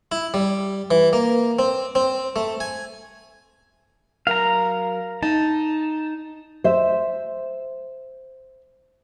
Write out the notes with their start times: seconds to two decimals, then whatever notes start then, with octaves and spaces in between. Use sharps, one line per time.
0.12 E4
0.34 G3
0.91 E3
1.13 A#3
1.59 C4
1.95 C4
2.36 A3
2.60 G#5
4.27 F#3 A#4 F5 A#5
5.23 D#4 A5
6.64 C5 E5